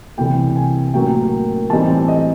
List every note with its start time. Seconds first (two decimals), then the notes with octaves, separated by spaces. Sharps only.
0.17 C2 C3 E3 A3 G5
0.56 G#5
0.94 A2 F#3 A#3 C#4 G5
1.70 A2 E3 G3 C4 D#4 A5
2.08 D#5